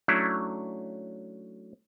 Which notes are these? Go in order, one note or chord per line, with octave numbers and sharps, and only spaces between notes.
F#3 A3 C#4 D4 E4